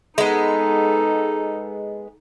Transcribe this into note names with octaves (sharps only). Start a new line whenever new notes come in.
G#3 B3 D#4 A4